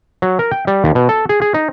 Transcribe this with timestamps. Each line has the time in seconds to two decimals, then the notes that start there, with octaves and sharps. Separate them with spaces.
0.22 F#3
0.39 A#4
0.51 G5
0.67 G3
0.84 D#2
0.95 B2
1.09 A4
1.29 G#4
1.42 G#4
1.54 D#4